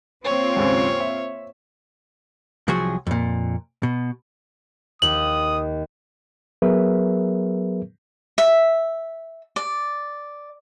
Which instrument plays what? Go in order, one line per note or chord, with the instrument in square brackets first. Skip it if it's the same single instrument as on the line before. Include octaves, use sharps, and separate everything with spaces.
[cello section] A#2 C4 F4 [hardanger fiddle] C#5
[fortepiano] D#2 G#2 C#3
E5
[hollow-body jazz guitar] C2 F3 F#3 F#4 G#4
F2 A#2
B2
[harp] D#2 [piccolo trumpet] D#6 [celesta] F#7
[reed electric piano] F#3 B3 G#4 A#4 B4 E5
[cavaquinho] E5
D5